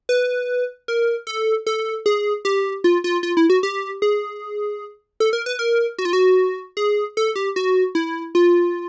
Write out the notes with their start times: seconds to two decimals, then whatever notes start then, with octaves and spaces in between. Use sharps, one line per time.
0.09 B4
0.88 A#4
1.27 A4
1.67 A4
2.06 G#4
2.45 G4
2.84 F4
3.04 F4
3.23 F4
3.37 E4
3.50 F#4
3.63 G4
4.02 G#4
5.20 A4
5.33 A#4
5.46 B4
5.59 A#4
5.99 F#4
6.05 F4
6.13 F#4
6.77 G#4
7.17 A4
7.36 G4
7.56 F#4
7.95 E4
8.35 F4